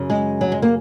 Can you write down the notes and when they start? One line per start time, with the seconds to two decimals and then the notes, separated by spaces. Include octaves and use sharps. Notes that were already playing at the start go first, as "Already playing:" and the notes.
Already playing: F#2 C#3
0.10 G#3
0.41 F#3
0.52 G#3
0.62 A#3